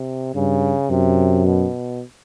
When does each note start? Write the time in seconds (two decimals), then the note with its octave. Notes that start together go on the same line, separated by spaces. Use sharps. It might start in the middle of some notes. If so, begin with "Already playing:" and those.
Already playing: C3
0.35 G2 C#3
0.90 F#2 C3
1.45 B2